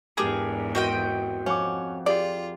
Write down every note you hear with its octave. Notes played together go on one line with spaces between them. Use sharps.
E2 G#2 D4 G4 G#4 A#4 D6 D#6
C4 F#4 A#4 D#5 G5
F2 C#4 F#5 D6
F4 G4 G#4 D5